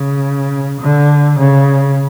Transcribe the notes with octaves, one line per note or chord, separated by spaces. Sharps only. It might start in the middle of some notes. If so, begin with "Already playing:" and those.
Already playing: C#3
D3
C#3